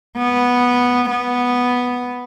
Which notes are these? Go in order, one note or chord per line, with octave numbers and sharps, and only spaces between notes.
B3
B3